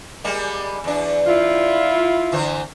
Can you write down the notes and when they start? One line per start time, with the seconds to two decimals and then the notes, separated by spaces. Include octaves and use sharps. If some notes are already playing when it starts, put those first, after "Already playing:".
0.24 G3 G#3 A#3
0.84 E2 D4
1.27 E4 F4
2.32 D3 E3 C5